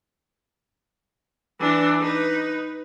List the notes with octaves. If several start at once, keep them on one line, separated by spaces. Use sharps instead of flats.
E3 D4
D#4 B4